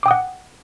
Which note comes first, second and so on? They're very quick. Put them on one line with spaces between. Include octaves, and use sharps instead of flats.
D6 G5 D#6 F#5